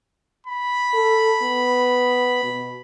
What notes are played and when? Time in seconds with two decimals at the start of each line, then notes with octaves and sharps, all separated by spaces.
0.47 B5
0.94 A4
1.42 B3
2.44 B2